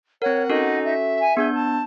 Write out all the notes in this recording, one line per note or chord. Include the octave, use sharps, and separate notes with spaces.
C4 A#4 C#5 F#5
C#4 D#4 F#4 A4
E5
G#5
B3 D4 G#4 G6
A5